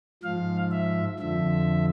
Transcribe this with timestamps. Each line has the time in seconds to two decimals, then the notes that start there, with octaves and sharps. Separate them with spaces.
0.23 G#2 F3 F5
0.71 E5
1.19 F2 D3 F3 E5